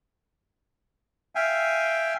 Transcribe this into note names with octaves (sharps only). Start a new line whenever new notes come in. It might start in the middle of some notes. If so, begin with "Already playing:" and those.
E5 F5 G5 G#5